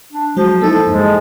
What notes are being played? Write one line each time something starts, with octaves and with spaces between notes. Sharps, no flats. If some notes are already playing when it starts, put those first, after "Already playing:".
D4
F3 F#3 G#3 F#4
A#3 D#4 E4 A4
E2 G2 G#3